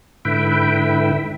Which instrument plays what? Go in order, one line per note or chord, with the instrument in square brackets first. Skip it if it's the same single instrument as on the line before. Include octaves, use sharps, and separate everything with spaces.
[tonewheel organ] G#2 D3 E4 B4 E5 G5